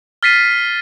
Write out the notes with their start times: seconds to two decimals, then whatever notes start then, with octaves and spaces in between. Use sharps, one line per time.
0.23 F6 A6 B6 C7 D#7